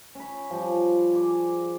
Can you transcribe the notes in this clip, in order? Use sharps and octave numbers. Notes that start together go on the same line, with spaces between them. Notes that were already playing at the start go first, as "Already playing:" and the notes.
C#4 B5
F3 G3 C5
G#4 D6